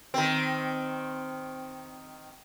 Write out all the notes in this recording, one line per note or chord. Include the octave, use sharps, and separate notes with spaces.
D#3 C4